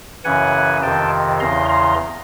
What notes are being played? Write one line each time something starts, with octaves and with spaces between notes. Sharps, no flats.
F#2 C#3 E3 F#5 G#5
F2 C3 D#3 G5 A5
E2 C#3 E3 A#5 C6
A#5 C6